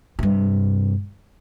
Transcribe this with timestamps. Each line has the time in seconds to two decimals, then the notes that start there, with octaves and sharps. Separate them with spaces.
0.19 G2 C3